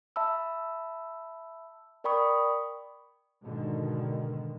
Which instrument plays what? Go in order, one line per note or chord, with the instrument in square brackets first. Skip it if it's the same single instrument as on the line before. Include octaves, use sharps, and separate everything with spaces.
[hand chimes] E5 A5 B5 E6
A#4 D5 G5 B5 C#6 D#6
[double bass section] G#2 B2 D3 D#3